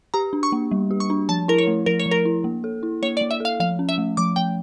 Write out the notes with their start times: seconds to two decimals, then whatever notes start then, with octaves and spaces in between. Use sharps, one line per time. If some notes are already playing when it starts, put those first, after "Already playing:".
0.14 G4 A#5
0.33 D4
0.43 C#6
0.52 A#3
0.71 G3
0.91 G4
1.00 C#6
1.10 D4
1.29 F3 A5
1.48 E4 A#4
1.58 C#5
1.67 A3
1.86 F3 A#4
2.00 C#5
2.06 F3
2.11 A#4
2.25 E4
2.44 A#3
2.64 A4
2.83 E4
3.02 A#3 C#5
3.17 D5
3.21 A#3
3.31 E5
3.40 A4 F5
3.60 F3 F5
3.79 C#4
3.89 E5
3.98 A3
4.17 F3 D6
4.36 F3 G5